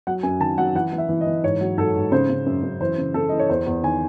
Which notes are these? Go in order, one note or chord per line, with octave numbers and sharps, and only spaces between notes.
F#3 F#5
F#2 G#5
D#3 A5
F#3 F#5
E3 F#5
E3
E5
E3
D#5
E3
G#2 C#5
F#3
G#2 A4
G#2
C#3 C5
C#3
F#2
F#2
E3 C5
C#3
C#3 A4
E3 D#5
C#5
E2 C5
E2
D#3 G#5